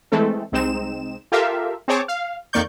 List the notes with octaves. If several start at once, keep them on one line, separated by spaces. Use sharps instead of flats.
E3 G#3 A3 C4 A4
C2 G#3 C4 D#4 E7
F4 G4 A4 A#4 E5 F5
C4 G#4 C5 C#5 A5 D6
F5
F2 D#3 A#3 D5 C#6 G6